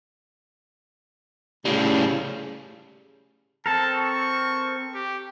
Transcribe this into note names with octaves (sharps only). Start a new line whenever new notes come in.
A2 C#3 G3
C4 A4 A#4 A5
C#6
G4